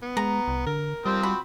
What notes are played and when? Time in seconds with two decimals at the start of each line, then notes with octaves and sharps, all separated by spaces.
0.02 B3
0.17 G#3 A#5
0.48 C2
0.67 D3 A#4
1.06 F3 G3 C4
1.23 F#4 B5